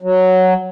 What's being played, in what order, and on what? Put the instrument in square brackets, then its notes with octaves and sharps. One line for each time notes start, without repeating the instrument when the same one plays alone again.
[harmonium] F#3